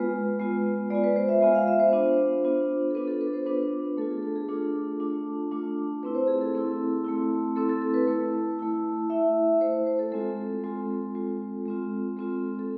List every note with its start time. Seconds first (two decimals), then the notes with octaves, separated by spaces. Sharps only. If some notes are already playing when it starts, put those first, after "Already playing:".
Already playing: G#3 B3 F4 B4
0.40 G#3 B3 F4
0.90 G#3 B3 F4 D5
1.04 B4
1.16 C5
1.29 E5
1.41 G#3 B3 F4 G#5
1.55 F5
1.68 E5
1.80 C5
1.93 B3 D4 F4
2.44 B3 D4 F4
2.90 A4
2.95 B3 D4 F4 B4
3.07 A4
3.21 B4
3.34 C5
3.46 B3 D4 F4 B4
3.97 A3 D4 F4 A4
4.11 G#4
4.23 A4
4.36 G#4
4.49 A3 D4 F4 A4
5.00 A3 D4 F4
5.51 A3 D4 F4
6.03 A3 C4 E4 B4
6.15 C5
6.28 G#4
6.41 A4
6.54 A3 C4 E4
7.04 A3 C4 E4
7.56 A3 C4 E4 A4
7.69 A4
7.82 A4
7.94 B4
8.07 A3 E4
8.59 A3 E4
9.10 A3 E4 E5
9.61 A3 E4 C5
9.87 C5
9.99 A4
10.12 G#3 C4 F4 A4
10.64 G#3 C4 F4 A4
11.15 G#3 C4 F4
11.66 G#3 C4 F4
12.17 G#3 C4 F4 A4
12.59 A4